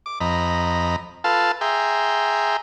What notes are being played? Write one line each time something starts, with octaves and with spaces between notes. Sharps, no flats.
D6
F2 D#5 A#5 B5
F4 A4 B4 F5 A5
G#4 E5 G5 A#5 C6